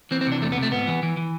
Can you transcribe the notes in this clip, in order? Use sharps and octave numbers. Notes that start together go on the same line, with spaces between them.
E3 C4
C4
C3
D4
E2 A3
B3
C3
A3
G#2 B3
E3
E3
E3